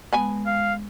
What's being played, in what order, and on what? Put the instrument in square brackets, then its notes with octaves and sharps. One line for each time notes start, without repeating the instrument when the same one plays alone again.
[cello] G#3 [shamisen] B3 G#5 B5
[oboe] F5